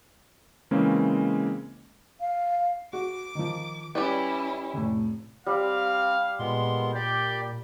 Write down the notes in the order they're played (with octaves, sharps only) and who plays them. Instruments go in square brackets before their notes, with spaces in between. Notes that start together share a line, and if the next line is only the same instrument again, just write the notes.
[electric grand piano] C#3 E3 G#3 A#3 C4 C#4
[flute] F5
[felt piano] F#4 [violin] D6
[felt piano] D#3 F3
[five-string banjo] G3 G4 B4 [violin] C#4 E4 [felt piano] D5 D6
[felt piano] F1 A2
[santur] G3 [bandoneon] C4 [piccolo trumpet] F5
[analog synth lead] A#2 [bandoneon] G#3 B3 C6
[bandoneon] G4 D5 [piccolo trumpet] G6